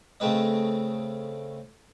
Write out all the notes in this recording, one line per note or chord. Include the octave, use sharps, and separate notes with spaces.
C#3 A3 C4 B4 D#5